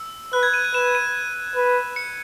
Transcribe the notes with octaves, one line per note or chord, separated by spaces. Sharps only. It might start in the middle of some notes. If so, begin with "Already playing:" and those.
Already playing: E6
B4 F#6
G#6
D#7
D#7
B4 E7
D#7
B4
C#7